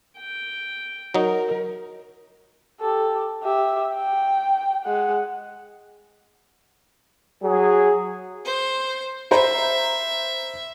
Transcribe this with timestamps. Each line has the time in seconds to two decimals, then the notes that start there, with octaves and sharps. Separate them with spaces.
0.18 G5
1.14 F#3 D#4 A#4
2.80 G4 A4
3.43 G4 E5
3.94 G5
4.85 G#3 F#5
7.43 F#3 G#4
8.45 C5
9.31 C5 E5 A#5 B5